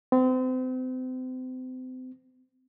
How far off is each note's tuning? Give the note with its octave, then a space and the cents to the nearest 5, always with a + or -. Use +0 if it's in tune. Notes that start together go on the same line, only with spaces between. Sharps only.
C4 -35